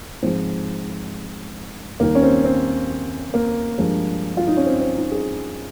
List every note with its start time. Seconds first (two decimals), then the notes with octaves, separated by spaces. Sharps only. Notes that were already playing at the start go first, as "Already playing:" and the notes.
0.22 G#2 F3 G#3 C4
2.00 D#2 D#3 G3 A#3
2.15 C#4
2.23 C4
2.45 C4
3.34 A#3
3.78 G2 F3 G#3
4.37 F4
4.47 D#4
4.57 C#4
4.66 C4
4.81 C4
4.97 D#4
5.11 G#4